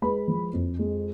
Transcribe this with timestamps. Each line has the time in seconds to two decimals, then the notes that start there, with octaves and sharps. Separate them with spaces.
0.02 G#3 B4 B5
0.28 F3
0.54 F2
0.79 G#3